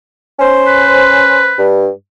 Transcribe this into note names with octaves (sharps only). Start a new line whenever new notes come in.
C#4 C5
B4
G2